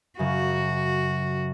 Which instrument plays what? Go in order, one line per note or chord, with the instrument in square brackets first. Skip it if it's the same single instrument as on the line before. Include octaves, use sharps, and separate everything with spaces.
[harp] F#2 C#3 [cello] F#4